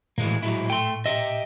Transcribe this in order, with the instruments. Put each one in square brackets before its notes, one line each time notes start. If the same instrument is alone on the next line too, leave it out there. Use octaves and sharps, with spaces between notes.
[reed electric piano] A2 [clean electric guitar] E3 G#3 A#3
[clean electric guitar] F#3 G#3 E4
[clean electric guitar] A3 [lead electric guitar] G5 C6
[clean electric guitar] G4 E5 [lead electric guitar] D#5